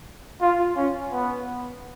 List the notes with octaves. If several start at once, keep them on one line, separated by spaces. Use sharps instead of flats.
F4
C#4
B3